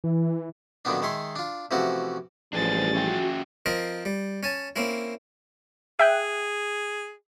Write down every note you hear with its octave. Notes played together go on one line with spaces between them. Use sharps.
E3
F#2 A#2 D3 D#3 B3 D4
D#3 G#3 C#5 E5 C6
D4 F4
C3 E3 F3 A3 C#4 F#4
A1 F3 G3 D4 G#4 B4 C5 A6
C#4 F#4 E5 G5
F3 C4 A#4 D#5
G3
C#4 G#5 A5
A#3 C4 C#4 E4
G#4 E5 G5 F#6